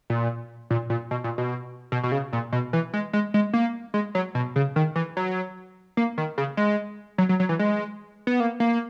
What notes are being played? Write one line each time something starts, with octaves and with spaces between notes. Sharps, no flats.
A#2
A#2
A#2
B2
A#2
B2
B2
B2
C#3
A#2
B2
E3
G#3
G#3
G#3
A#3
G#3
F#3
B2
C#3
D#3
E3
F#3
A#3
D#3
C#3
G#3
F#3
F#3
F#3
E3
G#3
B3
A#3
A#3